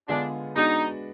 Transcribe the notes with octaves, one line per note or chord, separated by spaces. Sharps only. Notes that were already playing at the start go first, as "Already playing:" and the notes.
D3 G#3 B3 D4 F4 G#4
G#3 B3 D4 D#4 F#4